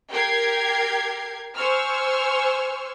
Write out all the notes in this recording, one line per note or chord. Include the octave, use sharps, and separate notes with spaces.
G4 A#4 G5 G#6 C7
C5 G#5 C#6 E6 F6